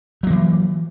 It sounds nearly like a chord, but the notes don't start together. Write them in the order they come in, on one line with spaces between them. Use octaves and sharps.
F#3 A#3 E3